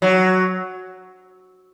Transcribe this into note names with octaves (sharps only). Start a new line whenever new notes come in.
F#3